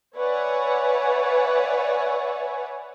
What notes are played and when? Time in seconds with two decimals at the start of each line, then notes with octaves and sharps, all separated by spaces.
0.17 B4 C#5 D5 E5 F#5 G#5